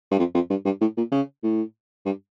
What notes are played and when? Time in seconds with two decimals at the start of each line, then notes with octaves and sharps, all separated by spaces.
0.11 G2
0.19 F2
0.34 F2
0.50 G2
0.65 G2
0.81 A2
0.97 A#2
1.12 C#3
1.43 A2
2.05 G2